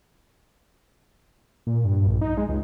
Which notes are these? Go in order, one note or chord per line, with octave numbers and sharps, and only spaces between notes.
A#2
G2
A#1
D#4
G#3
C#2